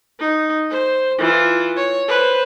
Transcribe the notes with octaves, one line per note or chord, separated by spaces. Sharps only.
D#4
C5
E3 F4
C#5
B4 C5